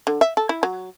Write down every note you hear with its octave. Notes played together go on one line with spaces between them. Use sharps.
D3
E5
A4
E4
F#3